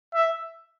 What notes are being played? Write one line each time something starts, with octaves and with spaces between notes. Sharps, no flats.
E5